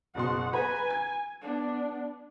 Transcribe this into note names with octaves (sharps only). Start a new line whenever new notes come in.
F#1 B2 F#5 C6
B4 G#5 A#5 B5
G#6
B3 D4